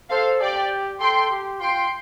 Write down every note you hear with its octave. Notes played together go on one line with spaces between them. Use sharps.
A4 C5 F5
G4 D5 G5
A4 G5 C6
G4
F4 G5 C6